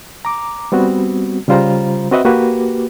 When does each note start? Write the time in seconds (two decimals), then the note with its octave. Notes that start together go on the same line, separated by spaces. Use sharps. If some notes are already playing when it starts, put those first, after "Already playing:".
0.25 A#5 D6
0.72 G3 B3 C4 F#4
1.48 C#3 G3 F4 C5 A#5
2.12 C4 F#4 B4 D#5 E5 F#5
2.25 A#3 F#4 G4 B4